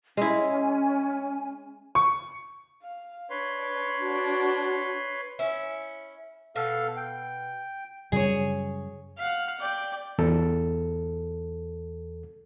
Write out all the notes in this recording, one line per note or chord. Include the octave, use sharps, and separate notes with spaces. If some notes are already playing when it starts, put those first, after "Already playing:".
G#3 C#4 E4 G#5
C#6
F5
D4 B4 C#5 C6
D4 F#4
C#4 E4
B2 A4 F5
G5
F#2 C#3 G3 G#4 C#5
F5 F#5
D5 G5
E2 A4